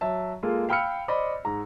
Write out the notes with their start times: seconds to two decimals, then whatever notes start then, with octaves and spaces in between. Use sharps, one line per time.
0.01 F#3 E5 A5
0.43 G#3 A#3 F4 A4
0.69 F5 G5 B5 E6 F6 C#7
1.08 C5 D5 D#5 B5
1.45 G#2 A#5